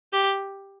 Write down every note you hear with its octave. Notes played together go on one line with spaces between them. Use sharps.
G4